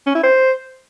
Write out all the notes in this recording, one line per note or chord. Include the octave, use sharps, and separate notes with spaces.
C#4
E4
C5